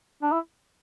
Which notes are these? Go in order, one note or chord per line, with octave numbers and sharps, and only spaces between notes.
D4
E4